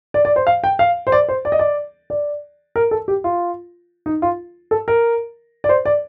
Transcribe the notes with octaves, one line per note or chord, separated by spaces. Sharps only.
D5
D5
C5
F5
G5
F5
C5
D5
C5
D5
D#5
D5
D5
A#4
A4
G4
F4
D#4
F4
A4
A#4
D5
C5
D5